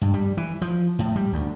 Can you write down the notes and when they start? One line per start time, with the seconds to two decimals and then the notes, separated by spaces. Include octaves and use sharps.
0.02 G2
0.14 G3
0.37 E3
0.62 F3
0.99 A2
1.16 G3
1.33 D2